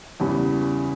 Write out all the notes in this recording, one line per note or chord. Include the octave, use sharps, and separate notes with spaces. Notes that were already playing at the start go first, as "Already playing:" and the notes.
E2 C#3 E3 G3 B3